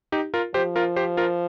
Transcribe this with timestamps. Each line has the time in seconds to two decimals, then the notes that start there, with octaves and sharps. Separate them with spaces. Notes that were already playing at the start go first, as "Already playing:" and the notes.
0.12 D#4 G4
0.34 F4 A#4
0.54 F3 G4 C5
0.76 F4 A#4
0.96 G4 C5
1.17 F4 A#4